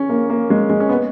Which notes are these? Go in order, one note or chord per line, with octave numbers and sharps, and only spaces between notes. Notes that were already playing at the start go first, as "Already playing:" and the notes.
Already playing: C#4
A#3
A#3
G#3
G#3
C#4
B3